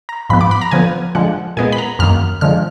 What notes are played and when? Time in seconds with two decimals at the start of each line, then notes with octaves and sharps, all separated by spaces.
0.09 A#5
0.30 G#2 F3 B3 B5
0.41 D6
0.51 B5
0.61 A#5
0.71 D3 F3 B3 G#5
1.15 D3 F3 G#3 F#5
1.57 A#2 G#3 B3 G#5
1.73 B5
1.78 A#5
1.99 F#2 D#3 A#3 F6
2.41 D3 F3 G#3 F6